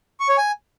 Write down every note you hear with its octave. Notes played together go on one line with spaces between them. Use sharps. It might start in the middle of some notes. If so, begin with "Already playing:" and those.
C#6
C#5
G#5